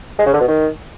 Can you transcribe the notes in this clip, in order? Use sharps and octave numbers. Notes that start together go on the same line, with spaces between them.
G#3
C#3
D3
B2
D#3